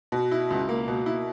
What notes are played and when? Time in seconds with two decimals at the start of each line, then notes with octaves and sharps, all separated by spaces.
0.12 B2
0.31 E4
0.50 C#2
0.69 A#3
0.88 B2
1.06 E4